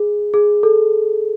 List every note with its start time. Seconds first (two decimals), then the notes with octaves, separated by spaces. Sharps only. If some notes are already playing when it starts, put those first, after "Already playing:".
Already playing: G#4
0.34 G#4
0.63 A4